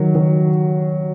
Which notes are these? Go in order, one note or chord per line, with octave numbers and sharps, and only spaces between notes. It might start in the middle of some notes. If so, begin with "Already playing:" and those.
Already playing: D#3 F#3
D#3